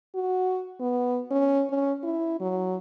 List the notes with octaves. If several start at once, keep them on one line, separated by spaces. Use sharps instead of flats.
F#4
B3
C#4
C#4
E4
F#3